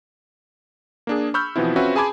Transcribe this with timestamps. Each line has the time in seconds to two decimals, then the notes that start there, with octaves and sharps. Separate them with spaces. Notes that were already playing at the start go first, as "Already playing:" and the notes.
1.07 A#3 D4 G#4
1.34 B5 C#6 E6 F6 G6
1.56 B2 E3 F3 B3 C4 E4
1.76 C4 C#4 F4 F#4 B4 E5
1.96 G#4 G#5 A5 B5 D6 G#6